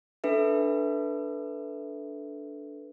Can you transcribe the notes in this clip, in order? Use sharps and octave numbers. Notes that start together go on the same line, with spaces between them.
D4 A4 B4 E5